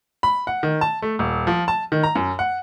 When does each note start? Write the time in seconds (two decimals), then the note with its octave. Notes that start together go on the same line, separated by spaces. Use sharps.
0.23 B5
0.47 F#5
0.63 D#3
0.81 A5
1.02 A3
1.19 D#1
1.47 F3
1.68 A5
1.92 D#3
2.03 A#5
2.15 F#2
2.39 F#5